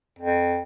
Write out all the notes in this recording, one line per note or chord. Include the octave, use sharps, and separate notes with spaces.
F2